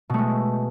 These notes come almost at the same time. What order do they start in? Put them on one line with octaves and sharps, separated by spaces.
B2 A3 G#3